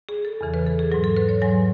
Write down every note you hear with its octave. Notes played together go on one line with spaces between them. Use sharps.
G#4
A4
E2 C#3 E3
B4
A4
G#4
G#2 F#3 G#4
A4
B4
C#5
G#2 F#3 G#5